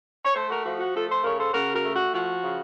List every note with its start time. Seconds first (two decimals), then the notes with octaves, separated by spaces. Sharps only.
0.24 C#5
0.34 A3 A4 C5
0.49 F#4 A#4
0.64 F3 F#4
0.78 F#4
0.94 A3 F4 A4
1.09 A4 C5
1.23 C#3 A#4 C#5
1.38 A4 C5
1.53 C#3 F#4 A#4
1.73 F#4 A#4
1.84 A3
1.93 F#4
2.13 F3 F#4
2.42 C#3